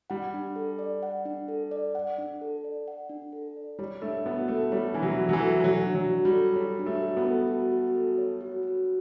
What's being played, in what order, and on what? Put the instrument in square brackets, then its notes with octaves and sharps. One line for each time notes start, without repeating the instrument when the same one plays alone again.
[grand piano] G3 [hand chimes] F#5
[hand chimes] D4
A4
D5
F#5
D4
A4
D5
F#5
D4
A4
D5
F#5
D4
A4
D5
[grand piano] G3 [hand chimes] C#5
[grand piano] A3 [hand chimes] D4
[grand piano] B3 [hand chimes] F#4
[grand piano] A3 [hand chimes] A4
[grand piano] G3 [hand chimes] C#5
[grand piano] E3 [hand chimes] D4
[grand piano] F#3
[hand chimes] F#4
[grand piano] F#3
E3
[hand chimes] A4
[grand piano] E3
[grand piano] F#3 [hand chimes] C#5
[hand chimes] D4
[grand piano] F#3
[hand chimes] F#4
[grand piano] G3
[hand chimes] A4
[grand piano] G3 [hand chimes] C#5
[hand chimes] D4
[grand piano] A3
[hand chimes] F#4
[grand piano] B3
[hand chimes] A4
F#4
F#4
A4
C#5
F#4
F#4